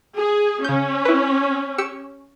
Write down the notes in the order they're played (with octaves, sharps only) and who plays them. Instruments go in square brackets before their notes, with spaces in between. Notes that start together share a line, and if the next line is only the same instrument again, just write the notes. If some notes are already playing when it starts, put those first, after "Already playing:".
[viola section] G#4
[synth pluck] C#3 G6 [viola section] C#4
[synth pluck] E4 B4
G4 E6 C#7